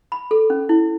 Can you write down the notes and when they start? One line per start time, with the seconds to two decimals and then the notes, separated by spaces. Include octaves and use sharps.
0.12 B5
0.31 A4
0.50 C#4
0.69 E4